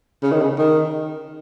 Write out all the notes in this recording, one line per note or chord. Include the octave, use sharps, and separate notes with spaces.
C#3
D#3
C#3
D#3